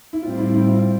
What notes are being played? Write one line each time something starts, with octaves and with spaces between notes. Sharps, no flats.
E4
A2 G3 C4 F4
E4
E4
F4